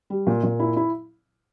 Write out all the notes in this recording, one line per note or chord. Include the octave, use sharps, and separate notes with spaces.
G3
A#2
A#2
E4
E4